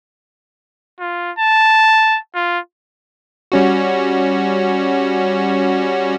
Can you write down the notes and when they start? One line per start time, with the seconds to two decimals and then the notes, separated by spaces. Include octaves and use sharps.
1.00 F4
1.39 A5
2.35 F4
3.52 G3 C#4 F#4